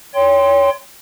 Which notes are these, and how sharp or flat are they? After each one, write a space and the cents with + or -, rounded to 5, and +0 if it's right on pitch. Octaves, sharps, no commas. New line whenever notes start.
C#5 +25 G5 +20 C6 +0